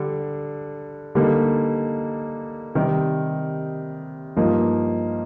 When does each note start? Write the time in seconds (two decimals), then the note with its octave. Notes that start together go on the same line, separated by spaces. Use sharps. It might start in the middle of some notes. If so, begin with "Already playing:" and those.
Already playing: D3 G3 D4
1.15 D3 G3 A#3 D#4
2.75 C3 D#3 G3
4.37 G2 F3 A#3 D#4